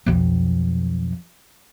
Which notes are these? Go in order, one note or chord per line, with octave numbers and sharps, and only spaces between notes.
B1 F2